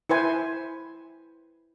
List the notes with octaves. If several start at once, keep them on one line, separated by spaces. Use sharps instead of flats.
E4 B4 C5 G#5